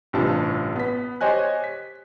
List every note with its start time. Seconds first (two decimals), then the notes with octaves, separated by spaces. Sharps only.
0.13 A1 G2 C3 F4 A5
0.76 B3 B6
1.21 G4 C5 C#5 D#5 G#5 F#6
1.64 B6